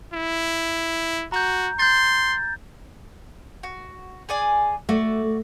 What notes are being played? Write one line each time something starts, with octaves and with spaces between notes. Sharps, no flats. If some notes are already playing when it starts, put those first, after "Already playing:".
E4
F#4 A#5 G6
C6 G6 A6
F#4
G#4 D5 G#5
A3 F#4 D5